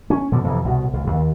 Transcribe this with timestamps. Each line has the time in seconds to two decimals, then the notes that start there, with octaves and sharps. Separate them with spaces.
0.10 C#4
0.32 B2 D3 F3
0.44 F2 C3 E3
0.64 C2 B2
0.93 C#2
1.07 D#2